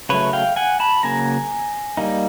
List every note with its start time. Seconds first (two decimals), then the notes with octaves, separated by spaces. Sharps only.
0.09 C#3 F#3 A3 B4 C#5
0.33 F5 G5
0.56 F#5 G#5
0.80 A5 B5
1.03 C#3 F#3 A#3 G#5 A#5
1.97 G3 A#3 D#4